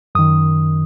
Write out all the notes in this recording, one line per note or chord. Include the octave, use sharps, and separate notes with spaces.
F#2 D#3 D#6